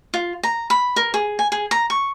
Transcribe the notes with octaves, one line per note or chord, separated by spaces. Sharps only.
F4
A#5
B5
A#4
G#4
G#5
G#4
A#5
C#6